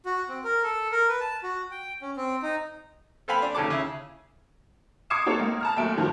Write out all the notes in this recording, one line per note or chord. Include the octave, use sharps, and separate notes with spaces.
F#4
C4
A#4
A4
A#4
B4
A5
F#4
G5
C#4
C4
D#4
A4 C5 F5 G5 G#5 B5
D4
D#2 C#3 A4 A5 D6
C#3 E4
D6 D#6 G#6 C7 C#7 E7
A#3 D#4 F#4 G4 A4 C#5
C#2 A#3
A5 A#5 F6
D#2 F#3 A3 D7
G2 D#3 F3 F#3 F#4